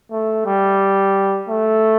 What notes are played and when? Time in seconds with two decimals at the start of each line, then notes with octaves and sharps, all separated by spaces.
0.11 A3
0.45 G3
1.49 A3